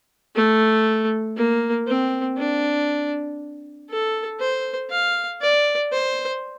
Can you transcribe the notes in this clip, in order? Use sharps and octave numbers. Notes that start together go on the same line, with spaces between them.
A3
A#3
C4
D4
A4
C5
F5
D5
C5